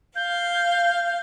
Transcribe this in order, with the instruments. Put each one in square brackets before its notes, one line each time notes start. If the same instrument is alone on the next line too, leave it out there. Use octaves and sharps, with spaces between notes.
[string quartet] F5 [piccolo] G6